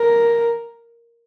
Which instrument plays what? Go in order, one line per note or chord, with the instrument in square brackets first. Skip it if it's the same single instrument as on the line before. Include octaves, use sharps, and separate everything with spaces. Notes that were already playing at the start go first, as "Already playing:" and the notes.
Already playing: [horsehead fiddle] A#4